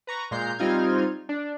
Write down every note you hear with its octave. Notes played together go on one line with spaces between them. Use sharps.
B4 A#5 C#6
A#2 G#3 A#5 G6 C7
G3 C4 D#4 F4 F6 G#6
D4